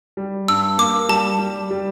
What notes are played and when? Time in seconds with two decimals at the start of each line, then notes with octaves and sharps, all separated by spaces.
0.17 G3
0.48 G2 E6
0.78 A#3 D6
1.09 G3 A5
1.39 G3
1.71 G3